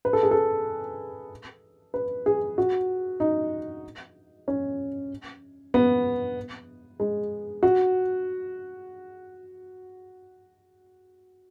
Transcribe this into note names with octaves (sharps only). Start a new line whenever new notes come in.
B4
A4
G#4
A4
B4
G#4
F#4
D#4
C#4
B3
G#3
F#4